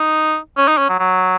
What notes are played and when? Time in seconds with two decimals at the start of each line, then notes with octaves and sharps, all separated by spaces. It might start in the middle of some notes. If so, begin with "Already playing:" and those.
Already playing: D#4
0.57 C#4
0.68 D#4
0.78 C#4
0.89 F#3
0.99 F#3